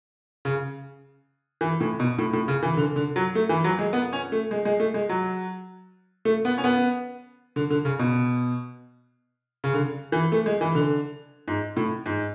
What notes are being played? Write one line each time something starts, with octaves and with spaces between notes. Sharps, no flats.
C#3
E3
A2
B2
A2
A2
C#3
E3
D3
D3
F#3
A3
E3
F#3
G#3
B3
C#4
A3
G#3
G#3
A3
G#3
F#3
A3
B3
C#4
B3
D3
D3
C#3
B2
C#3
D3
E3
A3
G#3
E3
D3
G#2
A2
G#2